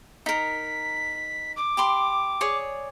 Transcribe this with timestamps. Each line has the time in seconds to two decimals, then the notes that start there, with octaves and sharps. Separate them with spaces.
0.26 D#4 A#4 B6
1.56 D6
1.77 G4 B5 C6
2.41 G#4 C#5 D5